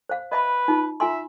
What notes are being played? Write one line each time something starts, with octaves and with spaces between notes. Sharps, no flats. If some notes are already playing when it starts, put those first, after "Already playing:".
C5 F5
B4 D#5 E5 B5
D#4 F4
F4 E5 G#5 C6